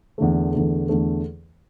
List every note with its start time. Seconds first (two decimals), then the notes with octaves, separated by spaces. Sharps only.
0.18 E2 D3 A3
0.54 E2 D3 A3
0.89 E2 D3 A3